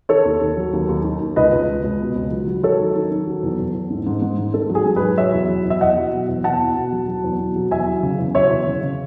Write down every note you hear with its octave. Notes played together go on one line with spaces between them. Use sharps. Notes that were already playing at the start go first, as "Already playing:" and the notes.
D#3 A4 C#5
D#2
D#2
F#3
D#2
D#2
D#3
D#2
C#2 B4 D#5
C#2
C#2
C#2
B2
C#2
F#3
F#3
F#3 A4 C#5
D#3
D#3
D#3
F#3
E2
E2
E2
G#2
G#2
G#2
G#2
G#2 A4
F#3
G#4
G#2
G#4 B4
F#3
F#3 C#5 E5
E2
F#3
E2
E5
E2 D#5 F#5
F#3
B2
E2
E2 F#5 A5
B2
B2
F#3
F#3
E2
B2
F#3
E2 E5 G#5
F#3
C#3
E2
F#3 C#5 E5
E2
C#3
C#3